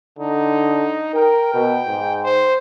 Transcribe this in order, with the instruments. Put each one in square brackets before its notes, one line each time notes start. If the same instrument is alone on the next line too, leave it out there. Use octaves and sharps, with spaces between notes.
[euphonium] D3 [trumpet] D#4
[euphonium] A#4 [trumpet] G5
[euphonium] B2
G#2
[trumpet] C5